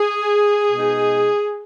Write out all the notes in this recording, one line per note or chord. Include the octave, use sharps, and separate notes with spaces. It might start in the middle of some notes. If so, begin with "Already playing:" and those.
Already playing: G#4
B2 G#3 D#4